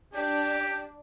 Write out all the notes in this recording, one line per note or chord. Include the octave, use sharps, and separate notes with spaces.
D4 G4